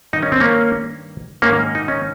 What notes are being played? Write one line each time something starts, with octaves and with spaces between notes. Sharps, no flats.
G2 D#3 D#4
C#4
C4
A#3 C#4
G#2 D#3 A#3 C#4
D#4
C#4